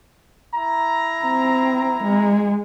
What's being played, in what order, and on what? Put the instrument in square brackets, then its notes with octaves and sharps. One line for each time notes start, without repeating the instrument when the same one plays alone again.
[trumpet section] E4 A#5
[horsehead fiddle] C4
G#3